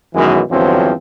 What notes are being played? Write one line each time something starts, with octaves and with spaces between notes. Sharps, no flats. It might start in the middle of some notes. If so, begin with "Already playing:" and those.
F#2 B2 D#3 E3 F#3 G#3
E2 G2 D3 F3 F#3 C4